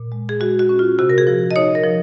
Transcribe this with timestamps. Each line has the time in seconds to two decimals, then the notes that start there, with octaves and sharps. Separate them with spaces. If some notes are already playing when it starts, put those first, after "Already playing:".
Already playing: A#2
0.12 G#3
0.29 G#4
0.40 G#3 F#4
0.59 F#4
0.69 C#4
0.79 F4
0.99 C3 F#4
1.10 A#4
1.18 G#4
1.27 F3
1.51 D#5
1.56 D#4 C#5
1.75 A#4
1.84 F3